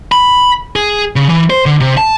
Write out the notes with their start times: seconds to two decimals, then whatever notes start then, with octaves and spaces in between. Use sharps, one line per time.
0.12 B5
0.76 G#4
1.16 C#3
1.29 E3
1.50 C5
1.66 D3
1.81 C3
1.97 A5